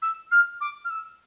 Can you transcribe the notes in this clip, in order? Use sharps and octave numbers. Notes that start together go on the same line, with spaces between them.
E6
F6
D6
F6
E6